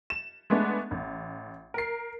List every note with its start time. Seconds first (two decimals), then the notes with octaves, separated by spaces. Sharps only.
0.10 E7
0.50 G#3 A3 B3 D4
0.91 A1
1.74 A#4 C7